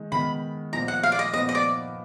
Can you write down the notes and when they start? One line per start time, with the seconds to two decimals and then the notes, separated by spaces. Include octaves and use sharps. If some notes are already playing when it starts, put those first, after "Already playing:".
Already playing: D#3 G#3 D#4
0.12 D#3 G#3 B3 D#4 B5
0.72 A#2 F3 B3 D#4 A#5
0.88 F#5
1.03 F5
1.12 D5
1.19 D#5
1.33 A#2 F3 B3 D#4 D#5
1.49 D#5
1.55 D5